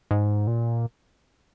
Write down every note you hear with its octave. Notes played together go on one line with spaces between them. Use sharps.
G#2
A#2